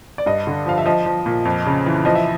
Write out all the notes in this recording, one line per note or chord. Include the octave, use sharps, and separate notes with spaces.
D5
G2 D#5
D3
F3 F5
E5
F3 D#5
F3
A#2
F2
C#3
E3
F3 D#5
E5